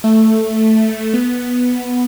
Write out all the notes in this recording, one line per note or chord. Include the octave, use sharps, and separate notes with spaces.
A3
A3
B3